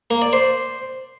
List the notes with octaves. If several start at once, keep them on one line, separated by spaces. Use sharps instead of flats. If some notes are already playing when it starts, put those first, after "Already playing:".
A#3
D5
C5